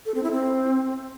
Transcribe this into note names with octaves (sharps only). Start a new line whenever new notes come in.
A4
C4
E4
C4